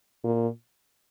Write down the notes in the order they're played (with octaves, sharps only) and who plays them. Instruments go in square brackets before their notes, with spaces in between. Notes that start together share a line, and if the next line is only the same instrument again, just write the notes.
[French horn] A#2